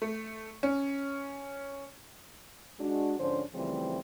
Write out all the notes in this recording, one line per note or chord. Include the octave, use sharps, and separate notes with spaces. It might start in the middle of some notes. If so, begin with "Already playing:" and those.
A3
C#4
G#3 D4 F#4
G#2 D3 F3 C#4 D4 C5
C#3 E3 F3 G3 A3 C4